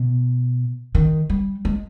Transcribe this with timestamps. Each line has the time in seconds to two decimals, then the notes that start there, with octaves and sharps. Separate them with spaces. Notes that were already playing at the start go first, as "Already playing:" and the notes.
Already playing: B2
0.95 D#3
1.30 G3
1.65 G#3